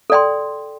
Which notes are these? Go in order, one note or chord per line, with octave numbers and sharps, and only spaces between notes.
A4 D5 G5 C6